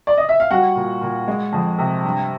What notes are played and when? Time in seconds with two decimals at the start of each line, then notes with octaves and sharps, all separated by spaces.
0.07 D5
0.17 D#5
0.29 E5
0.40 F5
0.50 G3 F#4 F#5
0.75 A#2
1.01 A#2
1.28 G#3
1.53 F2
1.78 C3
2.04 G2